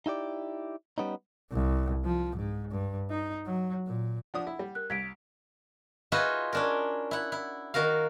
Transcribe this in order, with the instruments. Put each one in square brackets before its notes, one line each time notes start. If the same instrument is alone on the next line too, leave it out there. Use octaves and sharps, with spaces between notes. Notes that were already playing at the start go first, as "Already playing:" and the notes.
[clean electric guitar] D#4 E4 G4 D5
G3 B3 C#4 D#4
[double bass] C2
F3
G#2
G2
D#4
F#3
A#2
[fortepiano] F3 D4 D#6 [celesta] F#5
[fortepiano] E4
G3
[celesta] A#4 F#6
[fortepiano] C2 [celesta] G#6 B6 D7
[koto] D#4 F4 F#4 G#4 B4 E5
C#4 D4 A#4
E4 F#5
E4
D#3 F#4 A#4 F5